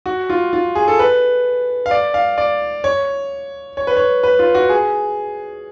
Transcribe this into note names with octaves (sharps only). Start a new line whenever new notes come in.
F#4
F4
F4
G#4
A4
B4
F5
D5
F5
D5
C#5
C#5
B4
C#5
B4
F4
F#4
G#4